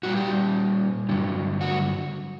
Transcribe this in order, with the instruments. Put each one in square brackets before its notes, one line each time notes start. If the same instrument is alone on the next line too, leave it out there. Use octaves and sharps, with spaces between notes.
[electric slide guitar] A#2 G3 F#4
G4
G2 D3 F#3
F#4